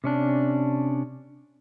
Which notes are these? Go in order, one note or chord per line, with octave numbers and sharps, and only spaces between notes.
C3 C#4 D4